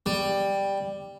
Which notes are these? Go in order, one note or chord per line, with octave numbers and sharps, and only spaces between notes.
G3